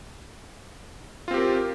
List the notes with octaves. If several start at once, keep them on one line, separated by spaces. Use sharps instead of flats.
C4 F4 G4 A#4